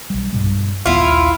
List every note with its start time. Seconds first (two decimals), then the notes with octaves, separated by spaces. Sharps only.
0.10 B1 G3
0.33 G2 B2 G3
0.86 A#1 D#2 B3 E4 F4